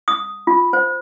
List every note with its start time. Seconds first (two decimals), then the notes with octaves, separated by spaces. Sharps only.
0.08 D#6
0.47 F4
0.73 C5